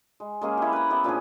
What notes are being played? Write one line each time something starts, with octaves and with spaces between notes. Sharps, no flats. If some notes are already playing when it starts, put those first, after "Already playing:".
G#3
G#3 A#3 C#4 G#4
E4 G4
B4 A#5
B3 G4 E5
A#2 F3 D4 G#4